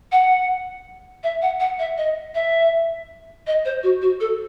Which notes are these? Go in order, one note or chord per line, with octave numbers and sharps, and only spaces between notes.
F#5
E5
F#5
F#5
E5
D#5
E5
D#5
C5
F#4
F#4
A4